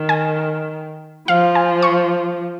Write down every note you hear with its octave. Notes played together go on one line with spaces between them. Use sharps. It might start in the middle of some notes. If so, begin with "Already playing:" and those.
Already playing: D#3
G#5
F3 F5
G#5
C#6